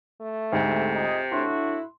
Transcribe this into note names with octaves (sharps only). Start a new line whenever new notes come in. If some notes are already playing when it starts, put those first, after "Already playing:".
A3
D2 G#2 C3
D#4 F4 G#4
A2 D4 E4 F#4 C6